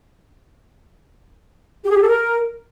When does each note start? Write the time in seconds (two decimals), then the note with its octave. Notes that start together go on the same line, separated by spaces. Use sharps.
1.84 G4
1.90 G#4
1.96 G4
2.02 A4
2.07 A#4